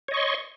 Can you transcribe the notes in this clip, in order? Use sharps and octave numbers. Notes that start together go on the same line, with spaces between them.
C#5 D#5 C6 C#6